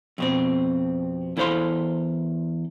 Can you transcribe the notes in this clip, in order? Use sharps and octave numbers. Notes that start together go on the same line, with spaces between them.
F2 B2 C4
E2 E4 A4 C5 F5 C6